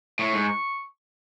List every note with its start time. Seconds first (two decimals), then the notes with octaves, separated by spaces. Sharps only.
0.19 A2 C#6
0.33 G#2